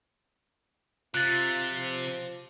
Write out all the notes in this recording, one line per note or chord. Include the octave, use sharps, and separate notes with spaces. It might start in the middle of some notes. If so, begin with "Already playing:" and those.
C3 F4 F#6 A6
F3